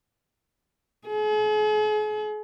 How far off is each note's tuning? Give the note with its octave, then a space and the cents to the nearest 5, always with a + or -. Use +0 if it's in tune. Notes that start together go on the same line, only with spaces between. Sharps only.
G#4 +40